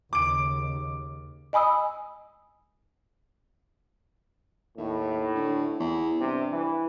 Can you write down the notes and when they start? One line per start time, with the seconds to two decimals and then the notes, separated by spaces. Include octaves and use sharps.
0.13 D#2 C#3 D6 D7
1.53 D#5 G#5 B5 D#6 E6
4.77 D#2 A2
5.34 D2
5.80 E2
6.20 G2 C3
6.51 E3